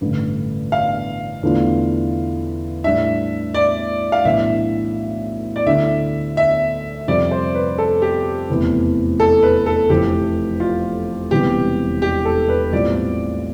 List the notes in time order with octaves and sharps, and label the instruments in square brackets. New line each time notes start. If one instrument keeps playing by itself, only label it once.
[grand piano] A1 G2 D3
[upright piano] F5
[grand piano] E2 D3 A3 D4 F4
[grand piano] A2 G3 D4 [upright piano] E5
[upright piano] D5
F5
[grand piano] B1 A2 E3 B3 D4 [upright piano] E5
[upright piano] D5
[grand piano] D2 D3 A3 E4 [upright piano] E5
[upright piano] E5
[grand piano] F2 C3 G3 [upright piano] D5
[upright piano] C5
B4
A4
G4
[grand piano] F1 E2 C3
[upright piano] A4
B4
A4
[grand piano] F1 F2 E3 [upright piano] G4
[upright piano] F4
[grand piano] E1 E2 C3 G3 B3 [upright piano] G4
[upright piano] G4
A4
B4
[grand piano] B1 A2 G3 C4 F4 [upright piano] D5